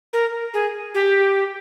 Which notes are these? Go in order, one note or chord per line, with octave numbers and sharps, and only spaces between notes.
A#4
G#4
G4